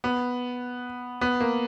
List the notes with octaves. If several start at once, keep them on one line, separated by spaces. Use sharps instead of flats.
B3
B3
A#3